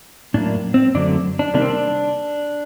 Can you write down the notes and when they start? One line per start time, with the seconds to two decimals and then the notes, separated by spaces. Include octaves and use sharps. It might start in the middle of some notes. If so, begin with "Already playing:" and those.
0.34 A2 F#3 A#3 D4
0.74 C4
0.94 F#2 D3 F#3 A3 D4
1.39 D4
1.54 C3 D#3 G3 A#3 D4
1.62 C4
1.70 D4